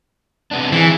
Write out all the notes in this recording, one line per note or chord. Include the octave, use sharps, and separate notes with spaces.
C3 B3 D4
E3 C4 G#4